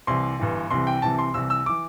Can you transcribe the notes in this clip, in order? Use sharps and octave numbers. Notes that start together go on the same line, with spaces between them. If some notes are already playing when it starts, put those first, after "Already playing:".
C2 C3 E3 C6
G1 G2 E3
C2 C3 E3 C6
G5
C2 C3 E3 A5
C6
C2 C3 E3 E6
E6
E3 D6